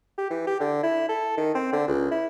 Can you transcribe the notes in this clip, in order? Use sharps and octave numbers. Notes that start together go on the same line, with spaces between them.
G4
E3
G4
D3
E4
A4
D#3
C4
D3
C#2
E4